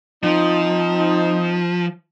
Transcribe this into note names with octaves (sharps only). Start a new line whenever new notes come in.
F3 C4 D#4